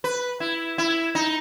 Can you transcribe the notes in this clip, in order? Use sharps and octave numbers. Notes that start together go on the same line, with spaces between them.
B4
E4
E4
D#4